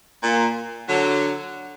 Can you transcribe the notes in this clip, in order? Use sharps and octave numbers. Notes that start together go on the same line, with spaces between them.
A#2
D3 F#3